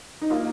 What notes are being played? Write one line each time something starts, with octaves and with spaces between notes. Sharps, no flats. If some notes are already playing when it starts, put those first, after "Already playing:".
D#4
A#3 F4